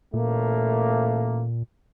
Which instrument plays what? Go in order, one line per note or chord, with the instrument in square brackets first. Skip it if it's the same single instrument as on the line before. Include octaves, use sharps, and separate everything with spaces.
[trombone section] A1 A3 A#3 [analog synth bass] A#2